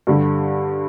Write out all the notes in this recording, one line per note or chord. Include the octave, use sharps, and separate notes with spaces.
G2 D3 G3